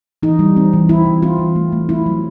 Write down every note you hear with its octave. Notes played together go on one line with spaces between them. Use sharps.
E3 D#4
G3
C4
E3
C4 E4
E3
C4 F4
E3
A3
A3
C4 E4
F#3